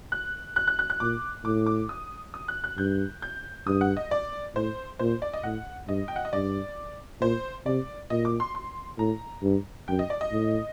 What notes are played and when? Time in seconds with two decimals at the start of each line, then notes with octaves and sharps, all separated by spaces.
0.12 F#6
0.56 F#6
0.68 F#6
0.79 F#6
0.90 F#6
1.00 A#2 D6
1.45 A2 D6
1.66 D6
1.89 D#6
2.34 D#6
2.48 F#6
2.64 F#6
2.78 G2 G6
3.22 G6
3.67 G2 D#6
3.81 F#5
3.97 D#5
4.11 D5
4.55 A2 C5
4.99 A#2 C5
5.22 D5
5.33 D#5
5.43 A2 F#5
5.88 G2 D#5
6.08 G5
6.16 F#5
6.25 D#5
6.33 G2 D5
7.21 A#2 C5
7.66 C3 D5
8.10 A#2 D#5
8.25 D6
8.40 C6
8.55 C6
8.98 A2 A#5
9.43 G2
9.88 F#2 G5
9.99 D#5
10.10 D5
10.21 D#5
10.32 A2